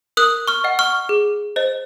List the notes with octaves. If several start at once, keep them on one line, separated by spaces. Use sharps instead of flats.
A#4 D#6 F#6
C#6 F6
D#5 F#5
C#6 F6
G#4
C5 D#5